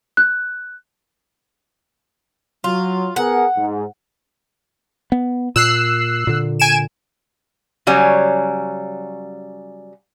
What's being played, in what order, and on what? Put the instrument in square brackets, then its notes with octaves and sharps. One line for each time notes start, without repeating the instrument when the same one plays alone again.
[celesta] F#6
[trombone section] F#3 [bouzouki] F4
[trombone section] B3 G#4 A#4 [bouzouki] F#5
[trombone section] G#2
[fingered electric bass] B3
[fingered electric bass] A#2 [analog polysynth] E6 F#6 C7
[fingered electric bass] A#2 D3
[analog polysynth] G#5 D7 E7
[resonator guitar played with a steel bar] C#3 F#3 G3 C#4